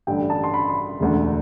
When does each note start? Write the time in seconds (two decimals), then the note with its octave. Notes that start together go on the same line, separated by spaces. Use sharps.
0.07 A1 G2 D3 G5
0.30 A5
0.44 C6
0.54 B5
0.69 C6
1.00 E1 D2 D3